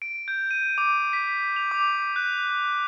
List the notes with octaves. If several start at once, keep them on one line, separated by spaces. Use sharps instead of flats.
D7
G6
D#7
D6
B6
F7
D6
F#6